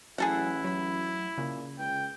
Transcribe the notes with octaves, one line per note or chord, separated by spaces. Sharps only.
A1 F#3 E4 G#4 A4 F#5
F#3 B5
A#2 C#3
C#2 G5